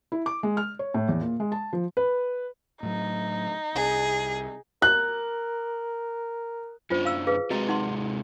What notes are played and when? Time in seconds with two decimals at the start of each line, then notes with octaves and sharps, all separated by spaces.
0.12 E4
0.26 D6
0.43 G#3
0.57 F6
0.79 C#5
0.94 A2
1.09 E2
1.21 A#2
1.40 G#3
1.52 A5
1.73 F3
1.97 B4
2.83 A2 F#3 D#4
3.75 C2 G#4
4.82 A#4 F#6
6.90 F#2 D3 F4 C5
7.05 F5 E6
7.27 G#4 B4 F5
7.50 C3 G#3 F#4 D#5 A#5
7.68 D#4 F#5 C6